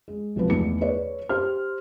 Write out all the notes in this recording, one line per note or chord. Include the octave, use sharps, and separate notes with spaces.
G#3
B1 C3 F3 B4
E2 A3 D#4 C#7
G#4 B4 C#5 D5
G4 C5 F6